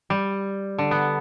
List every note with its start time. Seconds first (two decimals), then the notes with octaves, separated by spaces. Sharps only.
0.10 G3
0.78 D3
0.91 B3